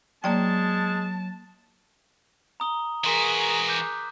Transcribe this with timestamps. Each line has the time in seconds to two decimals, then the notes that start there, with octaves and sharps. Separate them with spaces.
0.24 F#3 G#3 A#3 D5 G5 A5 C6
2.60 A#5 D#6 G7
3.04 E3 F#4 G#4 A#4 A#5 C6 B6
3.68 D6 F#6 G6